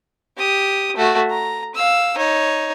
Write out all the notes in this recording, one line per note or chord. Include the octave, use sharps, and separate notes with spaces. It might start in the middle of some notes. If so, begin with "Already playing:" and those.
G4 D#6
A3 F#4
A#5
F5 E6
D#4 C#5